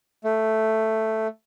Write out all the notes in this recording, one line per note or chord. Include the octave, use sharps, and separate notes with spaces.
A3